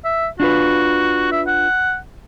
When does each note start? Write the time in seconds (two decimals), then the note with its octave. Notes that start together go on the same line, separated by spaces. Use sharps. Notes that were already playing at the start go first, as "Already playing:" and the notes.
0.04 E5
0.40 D4 F4 F#4 B4
1.32 E5
1.47 F#5